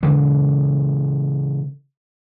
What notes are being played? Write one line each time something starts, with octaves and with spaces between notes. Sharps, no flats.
C#3 E3 G#3 C4